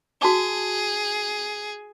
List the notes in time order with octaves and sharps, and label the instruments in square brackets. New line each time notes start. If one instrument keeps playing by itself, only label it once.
[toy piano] F#4 A5 D6 [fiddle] G#4